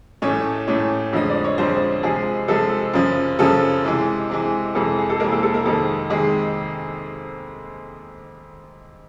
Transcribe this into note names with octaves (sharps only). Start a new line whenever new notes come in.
A2 E3 A3 C#4 C#5
A2 E3 A3 C#4 C#5
F2 D3 F3 G#3 D#5
D5
C#5
F2 D3 F3 G#3 C4 C5
C3 F3 G#3 G#4
C3 F3 G#3 A4
F#2 C#3 F3
F#2 C#3 F3 A4
C3 E3 G#3
C3 E3 G#3
F2 C3 E3 G#3 A4
G#4
A4
F2 C3 E3 G#3 A#3 A#4
A4
A4
A#3 A#4
F2 C3 D#3 G#3 A4
C3 D#3 G#3 G#4